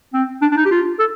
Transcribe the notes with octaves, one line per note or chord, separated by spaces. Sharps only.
C4
D4
D4
D#4
G4
F4
A4